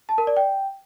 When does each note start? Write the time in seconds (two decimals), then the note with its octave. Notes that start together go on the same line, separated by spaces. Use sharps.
0.09 A5
0.18 A#4
0.27 D5
0.37 G5